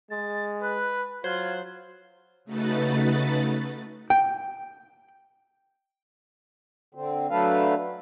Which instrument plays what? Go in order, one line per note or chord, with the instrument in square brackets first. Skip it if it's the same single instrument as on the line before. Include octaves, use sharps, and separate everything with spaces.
[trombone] G#3 [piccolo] A6
[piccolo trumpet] B4 [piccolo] F#6
[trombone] F#3 [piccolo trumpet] F4 [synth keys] C5 F#6 [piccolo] G#6
[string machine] C#3 A3 D#4 F#4 B4 A6
[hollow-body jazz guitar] G5
[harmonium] D3 C4
F#3 A3 D4 A4 B4 F5